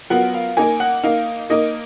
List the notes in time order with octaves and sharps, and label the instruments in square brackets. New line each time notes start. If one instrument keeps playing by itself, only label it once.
[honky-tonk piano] F#3 B3 F4 A#4 [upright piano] F#5
[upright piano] F5
[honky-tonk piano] A#3 D#4 A#4 [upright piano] G#5
[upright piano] F#5
[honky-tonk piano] A#3 D#4 A#4 [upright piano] F5
[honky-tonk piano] A#3 D#4 A#4 [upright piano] D#5